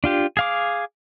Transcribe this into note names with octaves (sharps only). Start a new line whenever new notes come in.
D4 F4 G4
G#4 F5 D6